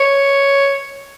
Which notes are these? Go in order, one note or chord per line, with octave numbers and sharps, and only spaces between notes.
C#5